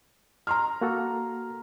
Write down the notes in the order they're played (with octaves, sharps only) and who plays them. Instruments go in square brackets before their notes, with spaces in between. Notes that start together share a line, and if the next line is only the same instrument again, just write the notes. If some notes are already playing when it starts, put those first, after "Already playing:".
[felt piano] A#5 C6 F6
[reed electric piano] A#3 F#4 A4